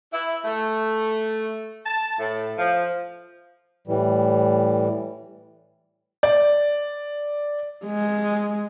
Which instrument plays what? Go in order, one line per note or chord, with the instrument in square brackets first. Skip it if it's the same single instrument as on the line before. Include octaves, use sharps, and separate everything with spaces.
[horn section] E4
A3
A5
A2
F3
[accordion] A2 E3 G3
[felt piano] D5
[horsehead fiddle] G#3